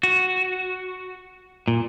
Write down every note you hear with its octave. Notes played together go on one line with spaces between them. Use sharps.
F#4
A#2